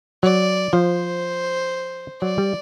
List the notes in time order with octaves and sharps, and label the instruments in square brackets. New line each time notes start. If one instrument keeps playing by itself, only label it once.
[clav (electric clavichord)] F#3 [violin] D5
[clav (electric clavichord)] F3 [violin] C5
[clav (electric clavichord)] F#3 [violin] D5
[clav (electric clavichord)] G3